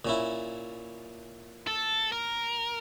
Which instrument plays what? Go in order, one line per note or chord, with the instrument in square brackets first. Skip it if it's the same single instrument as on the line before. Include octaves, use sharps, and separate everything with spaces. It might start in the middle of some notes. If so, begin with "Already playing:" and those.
[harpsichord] A#2 C#4 E4
[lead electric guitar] A4
A#4